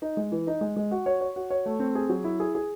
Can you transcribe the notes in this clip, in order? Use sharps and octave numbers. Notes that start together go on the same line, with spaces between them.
D#4
G#3
E3
D#4
G#3
G#3
F#4
C#5
C#5
F#4
C#5
A3
C4
G#4
F#3
E4
G#4
G#4